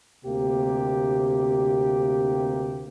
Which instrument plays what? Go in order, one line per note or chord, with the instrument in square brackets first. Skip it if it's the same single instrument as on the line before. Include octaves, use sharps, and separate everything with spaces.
[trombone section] D2 C3 A#3 G4